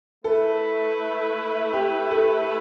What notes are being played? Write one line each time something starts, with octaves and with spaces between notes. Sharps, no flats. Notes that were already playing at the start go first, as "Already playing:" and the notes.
A3 E4 A4 B4
G4
A4